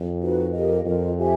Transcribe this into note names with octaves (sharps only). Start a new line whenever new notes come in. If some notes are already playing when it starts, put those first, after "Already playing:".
Already playing: F2
D#4 F#4 B4
G4 A#4 D#5
F2 F4 A#4 D#5
G4 C5 E5 G#5